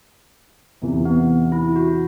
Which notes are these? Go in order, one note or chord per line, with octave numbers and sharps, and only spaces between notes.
E2 C3 E3
B3
E4
F#4